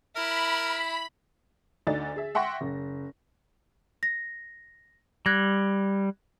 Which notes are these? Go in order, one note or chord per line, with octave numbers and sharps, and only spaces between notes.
E4 A#4 B5
D2 D3 D#4 D5 A6
G#4 E5
E5 F#5 G5 C6 C#6 A#6
F#1
A#6
G3 F#6 G#6 A#6